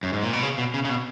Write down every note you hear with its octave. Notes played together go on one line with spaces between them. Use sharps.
F#2
G#2
A#2
B2
C#3
B2
C#3
C#3
B2